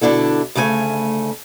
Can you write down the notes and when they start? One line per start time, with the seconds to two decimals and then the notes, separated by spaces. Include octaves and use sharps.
0.01 B2 D3 D4 E4 A4
0.55 D2 C#3 A3 A4 G#5